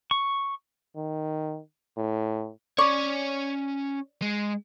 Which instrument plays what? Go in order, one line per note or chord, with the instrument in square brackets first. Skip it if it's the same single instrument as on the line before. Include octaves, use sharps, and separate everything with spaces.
[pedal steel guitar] C#6
[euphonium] D#3
A2
[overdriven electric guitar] C#4 C#5 [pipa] D5 C#6
[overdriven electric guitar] G#3